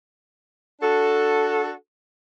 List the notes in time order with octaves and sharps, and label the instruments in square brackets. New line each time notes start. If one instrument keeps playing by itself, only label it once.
[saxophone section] D4 F#4 A4